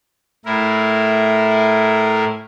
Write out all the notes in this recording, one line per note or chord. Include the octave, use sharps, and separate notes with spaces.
A2 E4 A#4